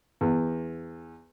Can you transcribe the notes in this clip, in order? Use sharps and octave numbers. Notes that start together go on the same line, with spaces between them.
E2